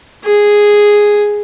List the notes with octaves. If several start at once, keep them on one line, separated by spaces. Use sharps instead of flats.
G#4